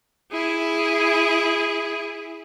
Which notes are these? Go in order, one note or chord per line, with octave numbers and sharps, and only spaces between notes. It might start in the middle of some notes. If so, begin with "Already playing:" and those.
E4 G#4